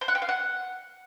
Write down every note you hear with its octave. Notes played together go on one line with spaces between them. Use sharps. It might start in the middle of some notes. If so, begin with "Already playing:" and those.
C5
F#5
G5
F5
F#5